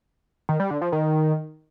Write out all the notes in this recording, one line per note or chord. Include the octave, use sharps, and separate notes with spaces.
D#3
G3
D3
F3
D#3